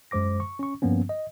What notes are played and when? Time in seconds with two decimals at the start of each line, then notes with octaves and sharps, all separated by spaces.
0.11 F#2 G#3 C5 D6 A#6
0.40 C#6
0.59 C#4 C#6
0.82 G2 F3 A#3 B3 C#4
1.09 D#5